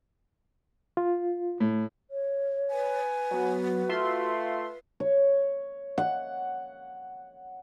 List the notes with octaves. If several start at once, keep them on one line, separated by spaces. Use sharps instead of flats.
F4
A2
C#5
B4 G#5
F#3 B3 F#4
A3 F4 E5 C6
C#5
F#5